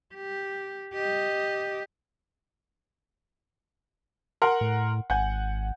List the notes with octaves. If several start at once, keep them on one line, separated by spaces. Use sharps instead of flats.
G4
G4 D#5
A#4 F#5 C6
A2
G#1 F#5 G#5 G6